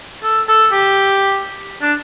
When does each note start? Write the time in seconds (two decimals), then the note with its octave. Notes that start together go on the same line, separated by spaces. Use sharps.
0.23 A4
0.48 A4
0.72 G4
1.82 D4